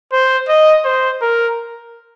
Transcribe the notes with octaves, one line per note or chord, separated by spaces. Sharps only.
C5
D#5
C5
A#4